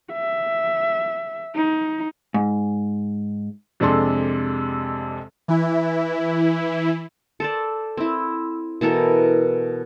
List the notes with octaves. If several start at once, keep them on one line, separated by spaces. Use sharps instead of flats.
E5
D#4
G#2
F2 C3 G#3 D4 A4 C6
E3 E4
A4 C5 D5
C4 E4
B2 E3 A4 A#4